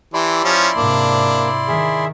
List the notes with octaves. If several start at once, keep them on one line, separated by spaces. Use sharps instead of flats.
E3 E4 G4 D5 A5 C6
F3 C#4
G#2 C3 A#3 D4
D#3 G#4 E5